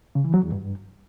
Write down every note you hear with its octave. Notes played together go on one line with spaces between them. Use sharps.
C#3
E3
F#3
E2
G2